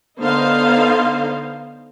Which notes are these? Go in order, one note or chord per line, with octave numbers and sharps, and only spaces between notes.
D3 B3 D#4 C5 F5